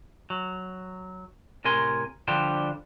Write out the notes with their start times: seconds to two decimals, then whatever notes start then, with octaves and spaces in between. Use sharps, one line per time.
0.30 F#3
1.65 A2 C3 A#4 G#5 C6
2.28 D3 F3 G3 D4 G4 C5